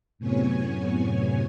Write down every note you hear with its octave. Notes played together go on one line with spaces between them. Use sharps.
F#2 A2 C3 B3 C#5 G#5